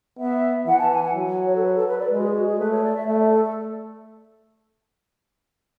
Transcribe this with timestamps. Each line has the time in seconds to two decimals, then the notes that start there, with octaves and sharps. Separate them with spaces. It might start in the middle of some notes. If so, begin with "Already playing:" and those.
0.19 B3 E5
0.67 E3 F#5
0.79 A5
0.91 G#5
1.03 F#5
1.15 F#3
1.47 C#5
1.55 A4
1.63 B4
1.75 A4
1.87 B4
1.99 D5
2.11 G#3 B4
2.18 F#4
2.23 G#4
2.35 F#4
2.47 G#4
2.59 A3 B4
2.71 C#5
2.83 D5
2.95 E5
3.07 A3 E5
3.19 D5
3.31 A4
3.43 A4